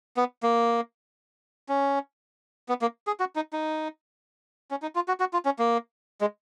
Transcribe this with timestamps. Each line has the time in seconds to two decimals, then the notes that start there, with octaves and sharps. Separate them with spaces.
0.17 B3
0.43 A#3
1.69 C#4
2.69 B3
2.82 A#3
3.07 G#4
3.20 F#4
3.36 D#4
3.53 D#4
4.71 C#4
4.82 D#4
4.95 F4
5.08 F#4
5.20 F#4
5.33 F4
5.45 C#4
5.59 A#3
6.21 G#3